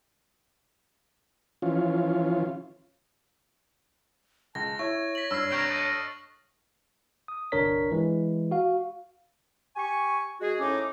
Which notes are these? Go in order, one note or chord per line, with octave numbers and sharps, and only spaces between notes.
E3 F3 C#4 F4
C#2 A5 A#6
E4 C#5 C#6
B6 F#7
G2 E6 F6 C7
C3 G5 A#5 C#6 F6 F#6
A4 D#5
D#6
G1 C2 D4 A#4 C#5 B6
E3 G#3
F#4 F5
G4 G#5 C#6
G#3 F#4 G#4
A2 C#4 D#4 D6